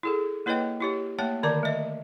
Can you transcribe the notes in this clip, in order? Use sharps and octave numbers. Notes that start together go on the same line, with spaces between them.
E4 G#4 A4
A#3 E4 B4 C#5 D#5 G5
E4 G4 C#5
A3 A#3 C#5 G5 A5
D3 D#3 D5 A5 A#5 D6
A3 D#5